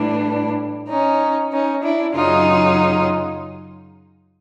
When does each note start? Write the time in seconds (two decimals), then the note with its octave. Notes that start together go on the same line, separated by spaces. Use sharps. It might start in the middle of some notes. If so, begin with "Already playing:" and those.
Already playing: A2 E3 G3 D4
0.88 C#4 D#4
1.52 C#4 D#4
1.83 D4 E4
2.14 F#2 C#3 F#3 D#4 F4